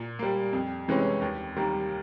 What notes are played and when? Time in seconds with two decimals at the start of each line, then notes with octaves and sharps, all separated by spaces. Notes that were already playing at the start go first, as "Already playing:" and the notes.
Already playing: A#2
0.19 G3 A#3
0.53 F2
0.88 C3 E3 G#3 C#4
1.21 D#2
1.57 D#3 G3 A#3